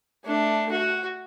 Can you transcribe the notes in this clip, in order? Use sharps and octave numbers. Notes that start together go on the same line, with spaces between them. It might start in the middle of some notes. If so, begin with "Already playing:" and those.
A3 D4
F#4